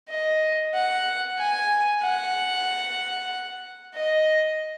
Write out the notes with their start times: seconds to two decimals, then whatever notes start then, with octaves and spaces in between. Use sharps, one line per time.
0.09 D#5
0.74 F#5
1.37 G#5
2.02 F#5
3.94 D#5